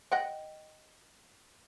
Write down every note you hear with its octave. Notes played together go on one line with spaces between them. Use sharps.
D#5 F#5 G5